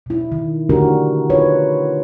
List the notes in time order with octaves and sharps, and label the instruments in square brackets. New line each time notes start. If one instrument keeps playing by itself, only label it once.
[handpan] B2 E4
D#3
D3 A3 D4 F#4 G4 A#4
D#4 F4 B4 C#5